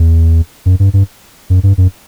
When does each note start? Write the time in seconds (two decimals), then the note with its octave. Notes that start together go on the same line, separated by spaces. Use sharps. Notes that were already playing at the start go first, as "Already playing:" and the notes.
Already playing: E2
0.66 F#2
0.80 G2
0.93 G2
1.50 F#2
1.63 G2
1.78 F#2